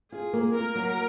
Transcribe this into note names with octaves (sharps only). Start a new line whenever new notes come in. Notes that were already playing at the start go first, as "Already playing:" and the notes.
F4 G#4
A#3
A#3 A#4
F#3